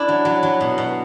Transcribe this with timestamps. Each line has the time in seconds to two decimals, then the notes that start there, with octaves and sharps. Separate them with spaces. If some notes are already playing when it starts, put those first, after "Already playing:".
Already playing: D4 E4
0.09 F#3
0.25 F#3
0.43 F#3
0.61 B2
0.78 B2